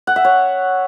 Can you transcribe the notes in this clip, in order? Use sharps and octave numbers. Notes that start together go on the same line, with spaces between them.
F#5
E5
C#5